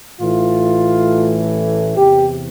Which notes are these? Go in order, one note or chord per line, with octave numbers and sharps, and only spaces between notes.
A1 A2 E3 A3 F4
E2 C3 E3 G4